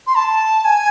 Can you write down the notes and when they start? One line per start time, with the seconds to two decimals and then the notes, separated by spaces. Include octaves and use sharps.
0.07 C6
0.16 A5
0.65 G#5